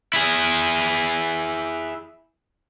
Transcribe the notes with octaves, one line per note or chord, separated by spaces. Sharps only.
E4 G#4